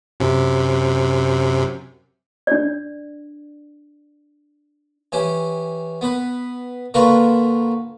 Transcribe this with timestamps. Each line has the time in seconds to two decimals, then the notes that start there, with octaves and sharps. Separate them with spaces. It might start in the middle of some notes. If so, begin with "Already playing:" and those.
0.20 F#2 C3
2.47 D4 D5
5.12 E3 C#4 G4
6.01 B3 B4
6.94 D3 A#3 F4 A#4 B4 C#6